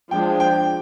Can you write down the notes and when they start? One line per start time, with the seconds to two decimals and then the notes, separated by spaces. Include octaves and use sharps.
0.11 F3 G#3 D4 G5
0.40 G5